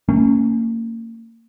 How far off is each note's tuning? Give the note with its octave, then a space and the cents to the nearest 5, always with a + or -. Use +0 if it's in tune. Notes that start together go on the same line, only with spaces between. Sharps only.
A#3 -35 C#4 +0